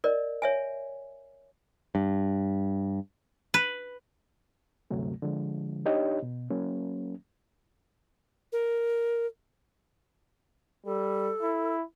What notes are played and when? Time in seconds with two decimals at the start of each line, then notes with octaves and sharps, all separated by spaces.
0.04 A#4 D5 D#5
0.42 C#5 E5 G#5
1.95 G2
3.54 B4
4.91 D2 G2 C3 F#3 A3
5.22 D3 F3 G#3
5.85 D4 D#4 G4 C#5 D#5
6.22 B2
6.50 F#3 A#3 C#4
8.52 A#4
10.86 G3 A4
11.42 E4